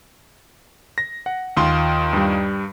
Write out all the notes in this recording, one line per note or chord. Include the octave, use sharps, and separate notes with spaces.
A#6
F#5
D#2 F4 C6
G2 G3